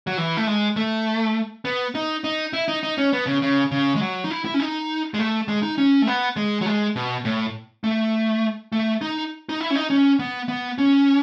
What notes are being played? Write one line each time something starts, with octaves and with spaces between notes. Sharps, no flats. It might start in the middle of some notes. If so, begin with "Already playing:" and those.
F#3
E3
A3
G#3
A3
B3
D#4
D#4
E4
D#4
D#4
C#4
B3
C#3
C#3
C#3
G#3
F#3
D#4
E4
E4
C#4
D#4
G#3
A3
G#3
D#4
C#4
A3
B3
G#3
F#3
G#3
B2
A2
A3
A3
D#4
D#4
E4
C#4
D#4
C#4
B3
B3
C#4